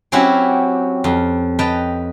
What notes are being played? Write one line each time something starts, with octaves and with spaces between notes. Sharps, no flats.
F#3 C4 C#4 E4 F#4 G4
F2
B4 D#5 G5 A5 A#5